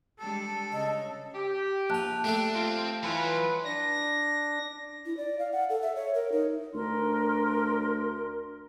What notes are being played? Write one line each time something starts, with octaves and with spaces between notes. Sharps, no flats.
G3 G#3 D4 A4 A5
C#3 C#4 D#5
G4
A#1 F4 A5 F#6
A3 D4 G4 A4
C4 F4
E3 F#3 F4 B4
D4 A#6
E4
D5
F5
F#5
A4
E5
C#5
A#4
D#4
D2 D4 A#4 C6